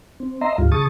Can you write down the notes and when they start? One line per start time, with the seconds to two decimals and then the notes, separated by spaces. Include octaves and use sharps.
0.20 C4
0.41 D#5 E5 A#5 C6
0.58 D2 G#2 G3 F4
0.72 C#3 G#4 A5 C#6 D#6 A6